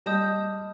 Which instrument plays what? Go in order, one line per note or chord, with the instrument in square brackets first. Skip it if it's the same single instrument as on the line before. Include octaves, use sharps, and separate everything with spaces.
[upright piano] G3 [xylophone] D#5 A5 D#6 G6